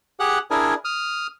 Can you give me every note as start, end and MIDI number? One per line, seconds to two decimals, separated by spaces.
0.20 0.39 67
0.20 0.39 68
0.20 0.39 78
0.20 0.39 90
0.51 0.74 62
0.51 0.74 64
0.51 0.74 68
0.51 0.74 70
0.51 0.74 80
0.85 1.27 87
0.85 1.27 89